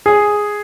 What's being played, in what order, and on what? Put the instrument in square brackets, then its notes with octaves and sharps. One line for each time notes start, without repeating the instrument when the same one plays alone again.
[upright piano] G#4